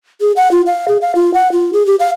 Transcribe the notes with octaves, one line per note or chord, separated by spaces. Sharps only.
G#4
F#5
F4
F5
G#4
F5
F4
F#5
F4
G#4
G4
F5